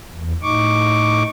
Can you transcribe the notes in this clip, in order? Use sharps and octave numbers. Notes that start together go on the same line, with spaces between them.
E2
A2 D#4 C#6 D6